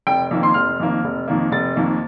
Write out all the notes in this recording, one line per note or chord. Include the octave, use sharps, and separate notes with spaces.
F1 G5
F2 D#3 A#3
C6
F1 F6
F2 D#3 A#3
F1
F2 D#3 A#3
F1 A6
F2 D#3 A#3